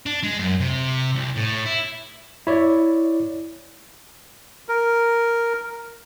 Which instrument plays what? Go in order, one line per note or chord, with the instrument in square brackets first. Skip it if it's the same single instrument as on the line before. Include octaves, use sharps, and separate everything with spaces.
[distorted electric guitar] D4
G#3
F#2
C3
C2
A2
E4
[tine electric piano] E4 C#5 D5
[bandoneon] A#4